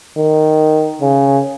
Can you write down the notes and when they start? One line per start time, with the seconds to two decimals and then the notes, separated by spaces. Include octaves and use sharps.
0.17 D#3
1.01 C#3